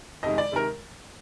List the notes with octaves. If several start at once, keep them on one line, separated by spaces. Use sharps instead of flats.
F2 C3 D#3 G#3 D#5
D5
C3 D#3 G#3 A#4